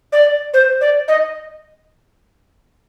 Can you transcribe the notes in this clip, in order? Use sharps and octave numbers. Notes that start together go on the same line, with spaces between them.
D5
C5
D5
D#5